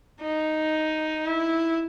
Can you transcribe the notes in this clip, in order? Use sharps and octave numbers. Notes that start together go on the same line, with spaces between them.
D#4
E4